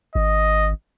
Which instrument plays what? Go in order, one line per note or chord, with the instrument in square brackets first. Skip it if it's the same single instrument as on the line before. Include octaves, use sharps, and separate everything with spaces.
[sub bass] G#1 [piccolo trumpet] D#5